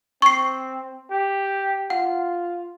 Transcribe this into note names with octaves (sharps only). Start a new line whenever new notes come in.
C4 C#6 C7
G4
F4 F#5